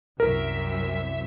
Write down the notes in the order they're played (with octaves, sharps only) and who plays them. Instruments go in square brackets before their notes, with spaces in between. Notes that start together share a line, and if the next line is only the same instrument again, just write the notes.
[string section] C2 F#2 E5 [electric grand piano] A#4